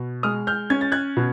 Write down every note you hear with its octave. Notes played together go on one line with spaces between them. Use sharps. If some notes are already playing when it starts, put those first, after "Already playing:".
Already playing: B2
G#3 D#6 F6
F6 G6
C#4 G#6
A6
F#6 G#6
B2